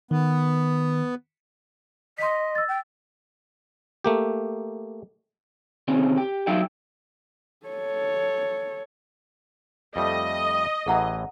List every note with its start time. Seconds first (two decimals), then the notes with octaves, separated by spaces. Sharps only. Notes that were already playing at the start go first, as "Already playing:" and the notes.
0.11 D#3 B3
2.18 D#5 C6 B6
2.55 E6 A6
2.68 G5
4.04 A3 A#3 G4
5.88 C3 D#3 C4 C#4
6.17 G4
6.47 F#3 D#4 E5 F5 G5
7.66 A4 C#5
9.96 F2 G3 A3 D#5
10.86 A1 A2 E3 G#4 F#5 A#5